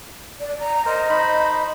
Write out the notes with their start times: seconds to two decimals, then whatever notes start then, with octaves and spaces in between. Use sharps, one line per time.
0.40 D5
0.60 A#5
0.86 A#4 C5 D#5
1.09 D#4 C5 B5